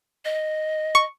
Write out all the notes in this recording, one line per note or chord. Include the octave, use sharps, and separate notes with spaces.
D#5
C#6